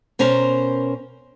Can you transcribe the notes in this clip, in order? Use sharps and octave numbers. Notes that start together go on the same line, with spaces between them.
B2 C#4 A#4 C5 A#5